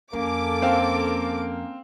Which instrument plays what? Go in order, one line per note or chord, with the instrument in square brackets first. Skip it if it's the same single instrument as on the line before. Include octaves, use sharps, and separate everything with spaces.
[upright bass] F2 [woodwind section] A#3 C#4 [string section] A4 D6
[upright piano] C4 F5